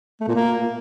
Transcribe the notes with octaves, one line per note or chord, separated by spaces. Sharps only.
A3
A#2
A#3